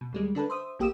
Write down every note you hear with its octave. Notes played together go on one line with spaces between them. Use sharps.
B2
D#2 G3 G#3
D3 D4 A4 B4
C5 E5 D#6
A#1 A#3 G4 D#6 E6 E7